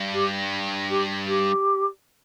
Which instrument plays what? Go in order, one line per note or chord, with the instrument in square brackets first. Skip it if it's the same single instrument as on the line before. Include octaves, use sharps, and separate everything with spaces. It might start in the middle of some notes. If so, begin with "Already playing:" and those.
Already playing: [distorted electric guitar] G2
[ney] G4
G4
G4